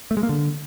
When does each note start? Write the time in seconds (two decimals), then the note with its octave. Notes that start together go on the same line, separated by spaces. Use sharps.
0.11 A3
0.17 G#3
0.23 A#3
0.29 D3